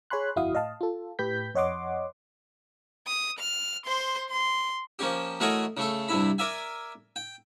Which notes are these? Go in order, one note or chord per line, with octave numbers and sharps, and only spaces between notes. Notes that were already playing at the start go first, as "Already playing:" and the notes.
G#4 C#5 G#5 B5 C6 F#6
G1 F2 E4 F#4 F5 D#6
A2 D#5 F5 A5
F4 A4
A2 G4 B4 G6 B6
F2 C#5 D#5 F#5 C6 D6
D#6
F6
C5 C6
C6
F3 A#3 C#4 G4
E3 A3 F#4 A#4 C#5 D#5
C#3 A3 A4
G2 C3 E4 B5
A#4 D5 E5 G#5
G5